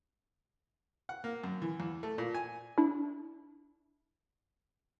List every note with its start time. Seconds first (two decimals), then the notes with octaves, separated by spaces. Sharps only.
1.09 F#5
1.24 A#3
1.44 F#2
1.62 E3
1.80 E2
2.03 A3
2.18 A#2
2.34 G#5
2.78 D4 E4